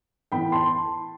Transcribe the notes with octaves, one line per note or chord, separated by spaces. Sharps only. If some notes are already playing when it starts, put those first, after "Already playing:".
A2 E3 B3 G5 B5
A5 C6